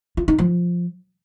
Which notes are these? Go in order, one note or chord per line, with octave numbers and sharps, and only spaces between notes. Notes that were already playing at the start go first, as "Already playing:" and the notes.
F4
D#4
F3